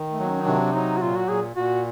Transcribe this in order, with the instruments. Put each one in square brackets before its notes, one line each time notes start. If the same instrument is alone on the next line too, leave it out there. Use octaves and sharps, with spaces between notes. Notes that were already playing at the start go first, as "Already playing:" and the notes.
Already playing: [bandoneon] D#3
[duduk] A3
[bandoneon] F#3
[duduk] C#4
D#4
[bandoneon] C3 [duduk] D4
[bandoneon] F#3 [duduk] D#4
[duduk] F#4
[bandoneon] A#2 [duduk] F4
[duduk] F#4
[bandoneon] A#2 [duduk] G#4
[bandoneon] A#2 [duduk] F#4